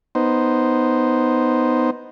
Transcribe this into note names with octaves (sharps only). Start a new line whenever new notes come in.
B3 D#4 C5